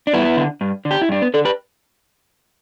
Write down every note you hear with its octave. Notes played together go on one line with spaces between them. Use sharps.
D4
G2 B3 E4
D3
G2
D3
G4
E4
G2 D4
B3
D3 A4 D5
G4 B4